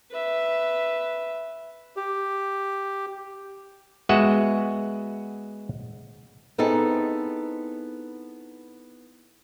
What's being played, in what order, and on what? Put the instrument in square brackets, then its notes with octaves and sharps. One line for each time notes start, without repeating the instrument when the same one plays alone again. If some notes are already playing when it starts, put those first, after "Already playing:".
[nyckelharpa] B4 E5
[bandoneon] G4
[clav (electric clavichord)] G#3 B3 F#4 D#5 E5 F#5
[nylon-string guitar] B3 C4 D#4 E4 G#4 A4